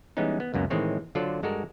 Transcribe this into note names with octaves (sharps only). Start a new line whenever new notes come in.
E3 G3 G#3 B3 C#4 D#4
B3
C#2 F#2 A#3 B3
A2 D#3 E3 G#3 C4 C#5
D3 F#3 F4 A4 C5 D5
G2 G#3 F#4 A4 A#4 D5